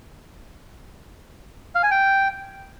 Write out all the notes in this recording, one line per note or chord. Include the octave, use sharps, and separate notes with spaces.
F5
G#5
G5